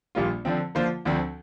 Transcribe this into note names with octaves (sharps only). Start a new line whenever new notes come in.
A#1 A#2 G3 A#3 F4
D3 F3 C4
D3 F3 A#3 F4 C5
D2 D3 F3 C4